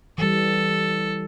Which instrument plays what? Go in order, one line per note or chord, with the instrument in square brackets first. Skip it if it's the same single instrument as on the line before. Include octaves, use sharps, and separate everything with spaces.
[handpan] E3 G3 [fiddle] A4